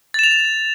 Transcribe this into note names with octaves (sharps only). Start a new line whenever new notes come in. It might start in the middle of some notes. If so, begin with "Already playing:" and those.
A6 E7 F7